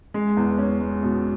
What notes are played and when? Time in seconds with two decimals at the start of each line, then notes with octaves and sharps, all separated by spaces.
0.14 G#3
0.37 E2
0.58 C#4
0.81 G#3
1.03 B2